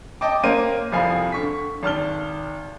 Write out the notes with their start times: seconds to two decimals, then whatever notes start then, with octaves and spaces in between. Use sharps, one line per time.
0.21 D#5 G5 A5 D6
0.44 A#3 C#4 C5 D#7
0.92 C2 F2 F3 F5 G#5 B5
1.32 D3 C#6 B6
1.83 G#1 A5 F6 G7